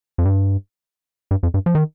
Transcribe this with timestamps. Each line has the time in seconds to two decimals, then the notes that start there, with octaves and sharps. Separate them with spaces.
0.18 F2
0.25 G2
1.31 G2
1.43 F2
1.54 G2
1.66 F3
1.75 D#3